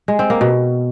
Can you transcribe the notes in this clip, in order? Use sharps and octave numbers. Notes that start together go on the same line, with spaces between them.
G#3
C4
A#3
B2